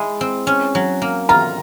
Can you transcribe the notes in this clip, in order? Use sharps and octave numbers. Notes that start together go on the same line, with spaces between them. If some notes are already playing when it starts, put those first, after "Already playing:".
Already playing: G#3 E4
C4
C#4
F#3
A#3
F4 A#5